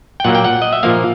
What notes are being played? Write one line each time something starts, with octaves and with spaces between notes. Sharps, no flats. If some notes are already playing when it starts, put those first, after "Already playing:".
G5
A#2 F#3 A#3 F#5
G5
F#5
D#5
E5
A#2 F3 A#3 F5